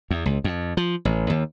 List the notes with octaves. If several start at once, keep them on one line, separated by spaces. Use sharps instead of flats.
E2
C#2
F2
F3
A1
D#2